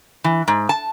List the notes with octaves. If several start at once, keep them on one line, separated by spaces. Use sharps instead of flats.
E3
G#2
A5